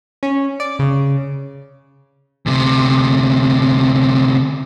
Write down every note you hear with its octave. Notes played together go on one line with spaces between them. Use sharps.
C#4
D5
C#3
D2 C3